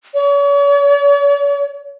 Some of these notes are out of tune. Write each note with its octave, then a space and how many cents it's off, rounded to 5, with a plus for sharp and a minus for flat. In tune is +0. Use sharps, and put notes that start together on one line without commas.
C#5 +40